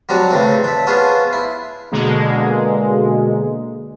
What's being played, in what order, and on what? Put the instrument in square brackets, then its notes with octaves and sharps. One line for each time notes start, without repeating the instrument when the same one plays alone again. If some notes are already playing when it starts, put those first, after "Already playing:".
[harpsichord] F#3 G3 C4 D4 F#4
A2 C#3 E3 C4
D4 E5
B3 C#4 D4 F4 G#4 C5
E4
[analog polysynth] B2 D3 G#3 A#3